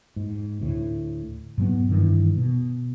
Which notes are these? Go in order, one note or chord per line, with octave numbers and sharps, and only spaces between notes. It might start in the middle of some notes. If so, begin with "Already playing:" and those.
G#2
D2 A2
G#2 F#3 B3
G2 D#3 E3
B2